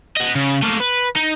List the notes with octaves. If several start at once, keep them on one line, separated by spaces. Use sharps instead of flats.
D#5 F#5
C#3
A3 A#3
B4
D#4